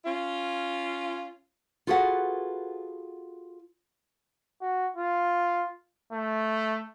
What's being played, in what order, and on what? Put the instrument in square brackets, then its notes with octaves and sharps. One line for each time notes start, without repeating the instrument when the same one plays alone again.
[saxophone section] C#4 F4
[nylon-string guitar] F4 F#4 G#4 A4 B4 F#5
[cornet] F#4
F4
A3